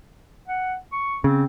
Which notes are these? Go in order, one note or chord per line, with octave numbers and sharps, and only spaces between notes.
F#5
C#6
C#3 C4